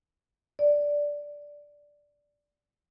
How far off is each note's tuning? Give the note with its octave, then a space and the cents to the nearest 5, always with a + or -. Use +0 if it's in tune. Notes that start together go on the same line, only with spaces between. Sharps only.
D5 -5